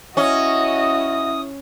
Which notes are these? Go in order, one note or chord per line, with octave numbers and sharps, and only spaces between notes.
C#4 E4 F#4 D#5 D#6